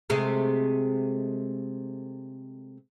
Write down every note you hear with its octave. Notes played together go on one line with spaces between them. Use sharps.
C3 G#3 A3